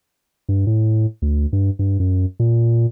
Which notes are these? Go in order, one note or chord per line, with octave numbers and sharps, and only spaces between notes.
G2
A2
D2
G2
G2
F#2
A#2